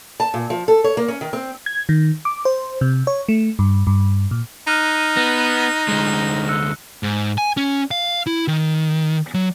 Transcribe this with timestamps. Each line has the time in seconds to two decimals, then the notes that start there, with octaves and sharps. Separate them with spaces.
0.20 A5
0.34 A#2
0.50 F3
0.68 A4
0.84 C#5
0.97 A#3
1.08 C#4
1.21 D#3
1.33 C4
1.66 G#6
1.89 D#3
2.25 D6
2.45 C5
2.81 C3
3.07 C#5
3.29 A3
3.59 G2
3.87 G2
4.31 A#2
4.67 D#4 F6 F#6 D#7
5.17 B3 A#6
5.88 D2 G#3
6.49 E6 F#6 C#7
7.03 G#2
7.38 G#5
7.57 C#4
7.91 F5
8.27 E4
8.48 D#3
9.34 F#3